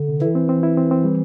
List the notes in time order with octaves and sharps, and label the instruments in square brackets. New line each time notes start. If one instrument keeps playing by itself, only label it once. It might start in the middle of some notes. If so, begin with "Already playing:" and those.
Already playing: [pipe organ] D3
[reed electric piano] C3
[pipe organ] E3 [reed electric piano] E4
[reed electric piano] C4
C4
E4
C4
C4
G3